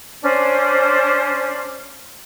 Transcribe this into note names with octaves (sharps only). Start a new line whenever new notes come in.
C#4 D4 C5